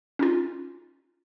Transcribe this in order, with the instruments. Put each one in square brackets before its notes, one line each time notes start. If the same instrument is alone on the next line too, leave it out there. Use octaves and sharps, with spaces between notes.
[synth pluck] C#4 D#4 F4